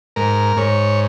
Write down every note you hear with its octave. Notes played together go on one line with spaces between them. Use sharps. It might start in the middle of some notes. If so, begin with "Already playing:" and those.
G#2 A#4
G#2 C#5